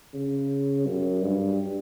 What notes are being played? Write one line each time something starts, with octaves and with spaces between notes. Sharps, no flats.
C#3
F#2
G2